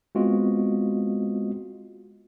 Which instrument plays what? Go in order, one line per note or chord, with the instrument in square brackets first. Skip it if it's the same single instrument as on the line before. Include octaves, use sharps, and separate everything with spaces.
[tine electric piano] G#3 B3 C4 F4 F#4 D#5